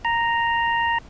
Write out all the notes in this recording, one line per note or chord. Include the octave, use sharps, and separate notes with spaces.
A#5